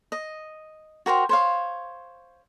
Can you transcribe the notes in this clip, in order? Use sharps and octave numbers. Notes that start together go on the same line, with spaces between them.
D#5
F#4 A#4 C5 G5
C5 C#5 F5